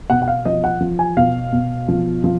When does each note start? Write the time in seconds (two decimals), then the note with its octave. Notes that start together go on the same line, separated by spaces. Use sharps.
0.10 B2 F#5
0.22 F#5
0.28 F5
0.45 F3 D#5
0.64 F#5
0.81 F3
0.99 G#5
1.17 B2 F5
1.52 B2
1.88 F3
2.24 F3